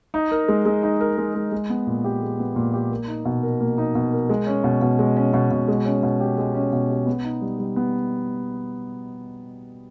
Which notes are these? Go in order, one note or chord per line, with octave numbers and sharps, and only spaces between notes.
D#4
A#4
G#3
G#3
D#4
A#4
G#3
G#3
G#3
B3
A#2
G4
G#3
B3
A#2
G4
A#3
D#4
B2
A#4
A#3
D#4
B2
A#4
G#3
C#4
B2
B2
G#3
C#4
B2
B2
G#3
C#4
B2
G4
G#3
C#4
B2
G4
B3
D#4
G3
G3
B3